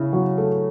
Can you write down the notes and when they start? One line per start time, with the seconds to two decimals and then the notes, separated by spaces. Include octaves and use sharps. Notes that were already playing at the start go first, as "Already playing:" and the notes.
Already playing: C#3 E4
0.13 F#3
0.38 A3